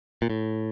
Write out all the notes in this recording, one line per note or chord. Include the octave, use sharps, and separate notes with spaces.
A#2
A2